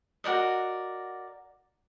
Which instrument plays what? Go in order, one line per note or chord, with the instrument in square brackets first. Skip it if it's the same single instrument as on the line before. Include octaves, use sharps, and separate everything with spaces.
[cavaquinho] F#4 A#4 D5 D#5